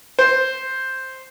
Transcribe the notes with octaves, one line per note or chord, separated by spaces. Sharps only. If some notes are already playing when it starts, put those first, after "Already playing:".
C5